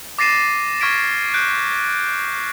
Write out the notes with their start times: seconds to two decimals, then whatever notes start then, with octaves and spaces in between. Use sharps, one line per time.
0.19 D6 A6 A#6 C7 D#7 E7
0.81 C#6 F6 G#6 B6 D7
1.34 F#6 G6 D7